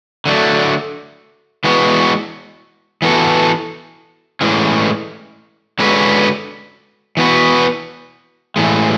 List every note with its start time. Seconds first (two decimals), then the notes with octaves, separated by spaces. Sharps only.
0.26 D3 F#3 A3
1.64 E3 G#3 B3 F#4
3.02 E3 B3 F#4 A4
4.41 A2 E3 G#3 C#4
5.79 D3 G#3 C#4 F#4 B4
7.17 E3 B3 F#4 B4
8.56 A2 E3 G#3